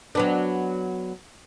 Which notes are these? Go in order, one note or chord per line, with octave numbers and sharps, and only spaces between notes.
F#3 B3 D4